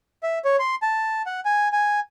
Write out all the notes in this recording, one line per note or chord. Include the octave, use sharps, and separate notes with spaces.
E5
C#5
C6
A5
F#5
G#5
G#5